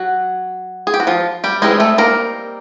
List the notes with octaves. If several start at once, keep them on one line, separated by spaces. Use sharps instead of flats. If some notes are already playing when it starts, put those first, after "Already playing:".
Already playing: F#3 F#4
G#4
G4
F#4
F3 F4
G3 G4
E3 G3 G#3 C4 D#4 G#4
A3 A4
A#3 A#4